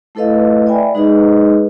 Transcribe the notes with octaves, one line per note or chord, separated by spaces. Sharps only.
A3 E4 A4 B4 D#5 F5
D5 E5 G5 G#5 B5
G#3 D#4 G#4 B4 D#5